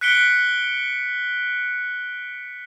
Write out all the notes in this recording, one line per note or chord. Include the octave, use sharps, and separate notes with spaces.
F#6 B6 C#7 D7 G7